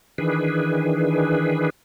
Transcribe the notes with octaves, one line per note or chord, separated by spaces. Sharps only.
D#3 E3 D4 G#4 B4